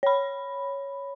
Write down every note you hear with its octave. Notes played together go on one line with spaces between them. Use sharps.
C#5 B5